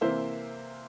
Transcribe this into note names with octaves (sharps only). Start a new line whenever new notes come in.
C3 E3 A#3 C5 E5